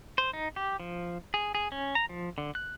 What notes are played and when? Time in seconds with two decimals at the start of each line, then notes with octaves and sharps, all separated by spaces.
0.18 C5
0.33 D#4
0.56 G4
0.80 F3
1.34 G#4
1.55 G#4
1.72 C#4
1.95 A#5
2.09 F3
2.38 D3
2.55 F#6